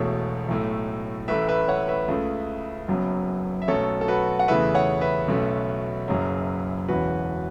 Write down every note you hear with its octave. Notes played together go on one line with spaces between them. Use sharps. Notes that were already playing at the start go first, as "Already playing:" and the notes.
Already playing: E1 E2 B2 A3 C#5
B1 A2 A3
A1 A2 A3 B4 E5
B4 E5
C#5 F#5
B4 E5
C#2 C#3 A3
F#1 F#2 F#3 B3
E5
B1 B2 A3 C#4 A4 C#5
A4
F#4 B4
F#5
E2 C#3 E3 A3 B4 E5
C#5 F#5
B4 E5
B1 B2 A3 C#4
F#1 F#2 C#3 F#3
E1 E2 E3 C#4 F#4 B4